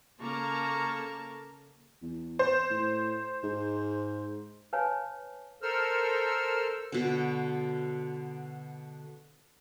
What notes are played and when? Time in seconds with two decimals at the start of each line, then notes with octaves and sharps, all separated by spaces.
0.21 C#3 A#3 A4 A5 A#5 C#6
2.02 E2
2.39 C5
2.70 A2
3.43 G#2
4.73 B4 C#5 F5 G#5 A5
5.62 A4 A#4 C5 E6 F6
6.92 B2 D3